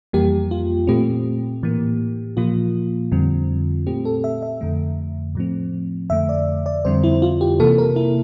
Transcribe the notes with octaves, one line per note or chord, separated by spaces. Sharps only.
F2 E3 G3 A#3 G4
F4
A#2 A3 C4 G4
A2 E3 A#3
A#2 F3 A#3 F4
F2 D3 G3 C4
A#2 A3 C4 G4
A4
E5
E5
F2 D3 A3
A2 F3 A3 C4
F2 D3 A3 E5
D5
D5
F2 D3 G3 C4 C5
E4
F4
G4
C3 E3 A#3 A4
A#4
E4